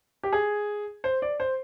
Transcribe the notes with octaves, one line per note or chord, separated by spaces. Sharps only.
G4
G#4
C5
D5
C5